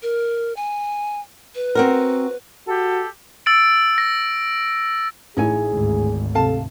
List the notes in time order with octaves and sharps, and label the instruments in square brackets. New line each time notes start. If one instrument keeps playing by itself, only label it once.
[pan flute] A#4
G#5
B4
[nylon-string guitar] C4 F#4 A#4
[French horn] F#4 [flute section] G4 A4
[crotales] E6 A6 D7
A#6
[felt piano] A1 E4 [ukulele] D#4 C#5 G#5 [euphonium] G#4
[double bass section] G#1 D2
[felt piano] C3 [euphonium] A4 [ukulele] F5 A5